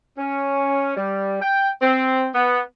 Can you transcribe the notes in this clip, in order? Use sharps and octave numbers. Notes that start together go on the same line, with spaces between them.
C#4
G3
G5
C4
B3